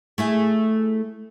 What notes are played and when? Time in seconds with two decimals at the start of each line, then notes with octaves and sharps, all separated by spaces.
0.18 A3 E4 G#4